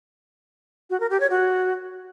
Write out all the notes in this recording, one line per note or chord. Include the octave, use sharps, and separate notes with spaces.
F#4
A#4
G4
C#5
F#4